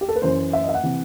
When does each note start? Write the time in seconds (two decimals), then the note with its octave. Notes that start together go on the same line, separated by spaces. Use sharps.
0.01 G4
0.09 A4
0.16 B4
0.22 F#2 E3 C5
0.53 E5
0.63 D#5
0.69 E5
0.74 F#5
0.84 C3 E3